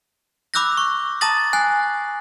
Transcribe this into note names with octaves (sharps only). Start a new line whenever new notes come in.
B5 D6 E6 F#6 G6 A#6
C#6
A5 A#5 D#6 A6 A#6 F#7
G#5 F#6 C7